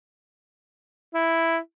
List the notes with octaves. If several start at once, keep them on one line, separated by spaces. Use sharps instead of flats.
E4